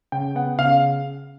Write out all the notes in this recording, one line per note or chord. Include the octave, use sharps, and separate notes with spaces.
C#3 G5
B3 F#5
C#3 F5